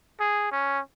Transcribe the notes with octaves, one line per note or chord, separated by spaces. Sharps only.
G#4
C#4